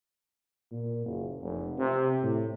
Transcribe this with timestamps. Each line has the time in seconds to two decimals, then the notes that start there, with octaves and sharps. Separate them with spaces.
0.72 A#2
1.05 F#1
1.41 F1
1.78 C3
2.23 A2